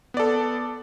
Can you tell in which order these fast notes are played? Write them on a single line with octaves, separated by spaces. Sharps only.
B3 D5 A4